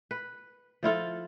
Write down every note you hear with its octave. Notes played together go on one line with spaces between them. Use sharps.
B4
F3 E4 F4 A4